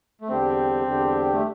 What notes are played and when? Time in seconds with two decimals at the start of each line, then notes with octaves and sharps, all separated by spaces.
0.21 A3
0.29 E2 D3 G3 C4 D4 G4
0.86 E2 D3 G3 D4 G4
1.33 A3